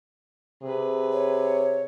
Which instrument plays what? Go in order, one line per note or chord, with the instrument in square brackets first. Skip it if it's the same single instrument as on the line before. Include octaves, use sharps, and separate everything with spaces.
[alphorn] C3 [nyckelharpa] G#4 B4
[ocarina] C#5